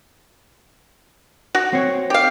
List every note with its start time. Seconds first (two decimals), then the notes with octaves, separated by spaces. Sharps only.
1.55 F#4
1.73 C4 C#5
2.10 G4 F5